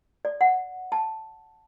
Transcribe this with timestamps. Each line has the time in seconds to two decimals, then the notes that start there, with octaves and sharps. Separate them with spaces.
0.25 D5
0.41 F#5
0.92 A5